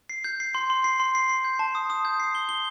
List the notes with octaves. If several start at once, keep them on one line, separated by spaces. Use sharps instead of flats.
C7
G6
C7
C6
C6
C7
C6
C7
C7
G6
A5
D#6
D#6
G6
C7
G7
G7